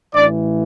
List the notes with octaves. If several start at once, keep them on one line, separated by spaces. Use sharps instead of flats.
A1 A2 E3 D4 D5